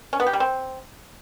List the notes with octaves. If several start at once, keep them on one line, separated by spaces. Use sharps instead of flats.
C#4
B3
G4
G3
C4